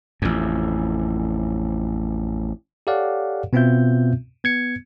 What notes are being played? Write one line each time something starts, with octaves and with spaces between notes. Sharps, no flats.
A1 F2
G4 A4 C#5 D5 F5 F#5
B2 B3 C4 F4 E5 G6
B3 G#6 C#7